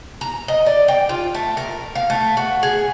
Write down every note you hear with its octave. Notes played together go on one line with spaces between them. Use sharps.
A#5
D#5
D5
G5
F4
A3
A#4
F5
A3
F#4
G#4